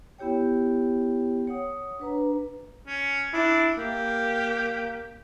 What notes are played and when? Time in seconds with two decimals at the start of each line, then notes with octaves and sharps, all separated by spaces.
0.19 B3 E4 G4 C#5 G5
1.47 C#5 F#5 D#6
2.00 D4 B4 A#5
2.87 C#4
3.33 D4 E4
3.78 A#3 G4